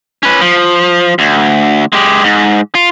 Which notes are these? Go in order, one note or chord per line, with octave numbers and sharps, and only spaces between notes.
C#4 B4
F3
D2
G#3 G4
G#2
F4